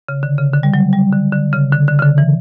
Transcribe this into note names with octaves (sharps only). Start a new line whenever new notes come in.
C#3
D3
C#3
D3
G3
F#3
G3
D3
D3
C#3
D3
D3
C#3
D3
E3